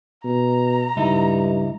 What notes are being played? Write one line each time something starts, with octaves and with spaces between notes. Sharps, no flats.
B2 A#5
C#2 G2 D#4 E4